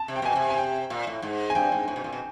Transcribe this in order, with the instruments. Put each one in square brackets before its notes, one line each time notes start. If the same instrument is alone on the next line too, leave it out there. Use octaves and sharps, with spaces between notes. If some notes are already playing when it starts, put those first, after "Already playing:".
Already playing: [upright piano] A5
[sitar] C3
[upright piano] G5
[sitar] B2 [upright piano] G#5
[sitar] C3
[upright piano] G#5
G5
[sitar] A#2
A2
G#2
[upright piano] G#5
[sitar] G2 [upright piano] G5
[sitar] G#2
A2
B2
A#2
B2